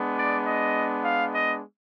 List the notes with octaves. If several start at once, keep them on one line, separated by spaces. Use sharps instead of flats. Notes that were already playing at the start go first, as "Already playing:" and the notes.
Already playing: G#3 B3 D4
D5
D#5
F5
D#5